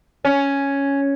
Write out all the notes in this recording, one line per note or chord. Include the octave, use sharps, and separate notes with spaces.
C#4